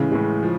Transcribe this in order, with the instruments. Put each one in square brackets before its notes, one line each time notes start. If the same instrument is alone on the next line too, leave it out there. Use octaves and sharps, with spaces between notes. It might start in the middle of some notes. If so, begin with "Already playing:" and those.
Already playing: [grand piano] A2 E3 G#3 [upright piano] C#3
[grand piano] A2 E3 G#3
F3